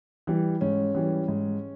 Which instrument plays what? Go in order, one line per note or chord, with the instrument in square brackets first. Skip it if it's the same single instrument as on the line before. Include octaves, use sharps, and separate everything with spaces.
[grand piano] E3 G3
G#2 C#4
E3 G3
G#2